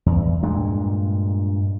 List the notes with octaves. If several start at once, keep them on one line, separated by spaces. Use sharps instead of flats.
E2
G2 A#2 G#3